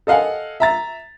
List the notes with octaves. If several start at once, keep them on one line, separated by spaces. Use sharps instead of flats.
A4 D#5 F5 F#5 G#5
E5 A#5 A6